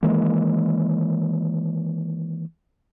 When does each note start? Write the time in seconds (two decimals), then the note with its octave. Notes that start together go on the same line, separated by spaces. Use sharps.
0.03 D#3 E3 G#3 A#3